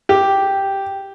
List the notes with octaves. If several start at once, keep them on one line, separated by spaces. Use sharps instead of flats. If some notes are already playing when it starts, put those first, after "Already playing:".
G4